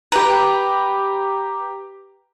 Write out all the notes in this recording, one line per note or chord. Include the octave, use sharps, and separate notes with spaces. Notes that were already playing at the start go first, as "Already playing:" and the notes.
G4 B4 G5 A#5